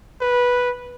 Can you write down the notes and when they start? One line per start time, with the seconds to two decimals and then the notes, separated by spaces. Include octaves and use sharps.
0.21 B4